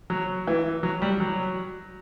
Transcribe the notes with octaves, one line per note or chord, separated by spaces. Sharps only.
F#3
E3
F#3
G3
F#3